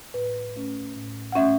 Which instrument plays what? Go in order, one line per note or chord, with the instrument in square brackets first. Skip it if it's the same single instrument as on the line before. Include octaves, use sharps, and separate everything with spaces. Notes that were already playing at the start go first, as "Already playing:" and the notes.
[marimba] A2 B4
A3 C#4
A2
F#5
A3 C#4 E5